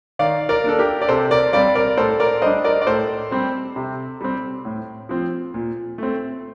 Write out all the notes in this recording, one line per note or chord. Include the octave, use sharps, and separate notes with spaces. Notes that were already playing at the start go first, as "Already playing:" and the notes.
D#3 D5 F5
A#4 D5
A#3 D4 A4
G4 A#4
D5
C3 A4 C5
A#4 D5
G3 C4 D5 F5
A#4 D5
A2 A4 C5
A#4 D5
G3 D4 C5 D#5
A#4 D5
D5
A2 A4 C5
G3 C4
C3
G3 C4
A2
F3 C4
A#2
A3 C4